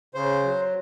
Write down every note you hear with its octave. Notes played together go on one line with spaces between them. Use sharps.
C#3 C5
F#3